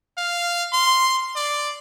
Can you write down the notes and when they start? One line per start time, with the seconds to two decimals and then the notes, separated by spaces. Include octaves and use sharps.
0.18 F5
0.73 C6
1.36 D5